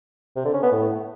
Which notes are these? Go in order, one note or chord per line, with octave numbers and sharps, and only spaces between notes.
C3
D3
C#4
B3
A2